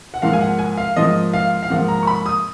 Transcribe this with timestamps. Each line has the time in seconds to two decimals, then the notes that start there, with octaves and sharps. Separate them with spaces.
0.14 F#5
0.22 G#2 F3 A#3 F5
0.33 G#5
0.41 F#5
0.59 G#5
0.78 F5
0.96 G#2 F3 A#3 D#5
1.34 F5
1.63 F5
1.70 G#2 F3 A#3 F#5
1.88 A#5
2.03 C#6
2.07 B5
2.26 D#6